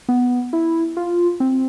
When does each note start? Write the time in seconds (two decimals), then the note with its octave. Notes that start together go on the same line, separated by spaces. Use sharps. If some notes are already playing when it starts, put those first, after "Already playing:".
0.09 B3
0.53 E4
0.97 F4
1.40 C4